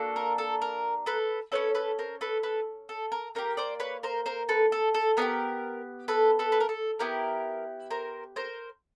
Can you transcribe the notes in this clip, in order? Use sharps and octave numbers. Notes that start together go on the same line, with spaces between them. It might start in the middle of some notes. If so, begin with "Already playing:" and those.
Already playing: A#3 D4 F#4 A4
A#4
A4
A#4
A4 B4
C#4 F#4 A4 B4 C#5
A4 B4
A#4 C5
A4 B4
A4 B4
A4
A#4
A#3 D#4 G4 A#4
C5 D5
B4 C#5
A#4 C5
A#4 C5
A4 B4
A4
A4
B3 D#4 G4 A#4
A4 B4
A4 B4
B4
A#4
A4
B3 E4 G4 A#4
A#4 C5
A#4 C5